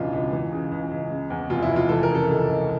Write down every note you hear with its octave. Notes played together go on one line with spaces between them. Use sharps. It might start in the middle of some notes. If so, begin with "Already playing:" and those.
Already playing: E1 C#2 C#3 E3 D4 F4
C#2
E3
C#3
C#2
C#2
C#3
E2
F1 F4
E4
F1
F4
E3 A4
A#4
C#3
A4
C#2 A4
C#2